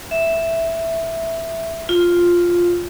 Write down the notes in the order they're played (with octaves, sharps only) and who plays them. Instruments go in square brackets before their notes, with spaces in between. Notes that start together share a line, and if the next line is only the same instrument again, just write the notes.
[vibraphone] E5
F4